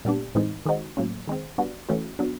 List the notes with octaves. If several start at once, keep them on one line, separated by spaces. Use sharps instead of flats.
A#2 G3 B3 D4
A2 E3 G#3 C4 D#4
D#3 G#3 C4 D#4 F#4
A2 F#3 A#3 C#4
D#3 G#3 C4
G3 B3 D4 F#4
E3 A3 C#4 F#4
F#3 B3 D4